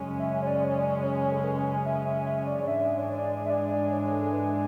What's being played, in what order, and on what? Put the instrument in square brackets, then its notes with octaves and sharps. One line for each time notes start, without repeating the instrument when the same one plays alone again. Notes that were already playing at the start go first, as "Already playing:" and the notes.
Already playing: [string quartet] F#2 C#3 G#3 C#4 G#4
[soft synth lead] E5
C#5
D5
C#5
D5
C#5
A4
B4
E5
E5
E5
D5
D5
[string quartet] G#2 E3 G#3 D4 G#4 [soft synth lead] E5
[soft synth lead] C#5
D5
E5
D5
D5
C#5
A4
B4